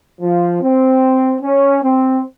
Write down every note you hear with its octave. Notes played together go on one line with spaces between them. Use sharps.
F3
C4
C#4
C4